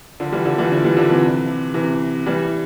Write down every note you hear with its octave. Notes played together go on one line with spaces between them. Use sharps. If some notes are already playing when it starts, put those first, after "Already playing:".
D3 F3
E3 G3
D3 F3
E3 G3
D3 F3
E3 G3
D3 F3
C3 E3
C3 E3
E3 G3